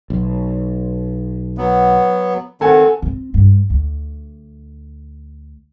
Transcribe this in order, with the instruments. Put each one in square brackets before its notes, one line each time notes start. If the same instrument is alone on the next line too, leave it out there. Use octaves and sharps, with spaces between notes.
[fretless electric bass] B1
[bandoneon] F#3 B3
[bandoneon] D#3 C4 [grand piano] A4 F#5 G#5
[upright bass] C4
G2
D2